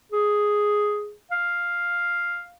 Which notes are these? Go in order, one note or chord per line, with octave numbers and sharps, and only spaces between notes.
G#4
F5